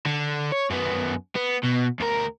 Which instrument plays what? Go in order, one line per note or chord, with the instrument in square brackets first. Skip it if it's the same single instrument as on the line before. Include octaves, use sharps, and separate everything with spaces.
[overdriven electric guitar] D3
C#5
F#2 B3
B3
B2
D2 A#4